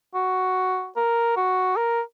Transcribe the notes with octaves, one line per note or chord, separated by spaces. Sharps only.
F#4
A#4
F#4
A#4